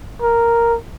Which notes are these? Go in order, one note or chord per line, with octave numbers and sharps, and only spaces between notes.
A#4